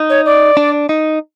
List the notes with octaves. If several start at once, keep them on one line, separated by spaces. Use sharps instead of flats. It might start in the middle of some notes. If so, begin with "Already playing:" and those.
Already playing: D#4
C#5
D5
D4
D#4